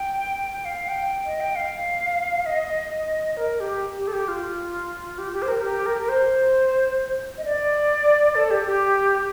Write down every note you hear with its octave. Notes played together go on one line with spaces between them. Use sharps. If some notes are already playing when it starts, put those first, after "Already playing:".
Already playing: G5
G5
F5
G5
D#5
G5
F5
D#5
A#4
G4
G4
A4
G4
F4
G4
G4
C5
A#4
G4
A#4
A#4
C5
D#5
D5
A4
G4
G4